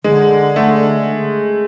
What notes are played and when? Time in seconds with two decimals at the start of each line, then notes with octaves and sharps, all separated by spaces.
0.04 D3 G#3
0.56 A3